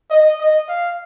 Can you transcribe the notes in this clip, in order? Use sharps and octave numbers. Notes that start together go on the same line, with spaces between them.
D#5
D#5
F5